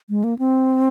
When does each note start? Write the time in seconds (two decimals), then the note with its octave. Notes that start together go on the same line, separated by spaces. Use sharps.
0.09 G#3
0.24 A#3
0.39 C4